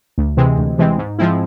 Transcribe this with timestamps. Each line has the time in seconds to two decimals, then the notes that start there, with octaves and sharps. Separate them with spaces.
0.18 D2
0.37 C3 E3 G#3 C4
0.58 D2
0.79 C3 E3 G#3 C4
0.98 G#2
1.19 F3 G#3 C4 E4